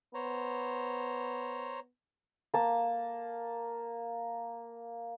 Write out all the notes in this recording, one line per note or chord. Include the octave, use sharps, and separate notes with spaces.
B3 C5 C#5 A#5
A#3 A5